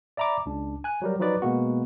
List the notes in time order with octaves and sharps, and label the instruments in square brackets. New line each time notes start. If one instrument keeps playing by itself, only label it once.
[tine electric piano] D5 E5 A#5 B5 D6
C#2 D4
G#5 F#6
F#3 G3 A#4
F3 F#3 D#4 F#4 B4 D5
B2 G#3 A#3 B3 F#4